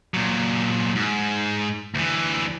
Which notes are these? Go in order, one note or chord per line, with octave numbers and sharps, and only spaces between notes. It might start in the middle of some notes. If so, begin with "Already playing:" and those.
A#2 F#3
G#2
D2 E3